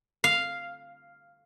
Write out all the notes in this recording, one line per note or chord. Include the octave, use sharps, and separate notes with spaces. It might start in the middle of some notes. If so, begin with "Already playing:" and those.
F5